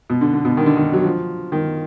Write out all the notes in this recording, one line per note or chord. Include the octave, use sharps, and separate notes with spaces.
B2
D3
D3
B2
D#3
D3
D#3
F#3
F3
D#3